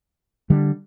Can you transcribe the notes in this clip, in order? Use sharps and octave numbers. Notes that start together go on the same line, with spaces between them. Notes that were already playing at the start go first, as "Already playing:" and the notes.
D3 G3